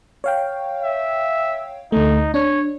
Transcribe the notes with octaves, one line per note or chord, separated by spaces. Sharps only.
C#5 F5 G5
E5
D2 A3 D#4
D4 C#5